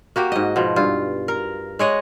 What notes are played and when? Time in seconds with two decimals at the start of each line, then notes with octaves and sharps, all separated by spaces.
0.16 A#3 F#4 G4
0.32 G#2 D#5
0.56 B2 F3
0.76 G2 F4
1.28 A#4
1.79 G#3 C#5 D#5 F#5